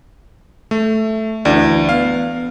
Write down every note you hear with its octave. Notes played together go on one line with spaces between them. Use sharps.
A3
D2 E3 D4
B3 F5